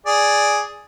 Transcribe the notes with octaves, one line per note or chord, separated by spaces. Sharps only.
G#4 D5